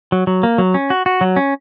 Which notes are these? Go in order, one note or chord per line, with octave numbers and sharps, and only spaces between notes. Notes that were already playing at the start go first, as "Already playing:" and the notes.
F#3
F#3
A#3
F#3
C#4
F#4
F#4
F#3
C#4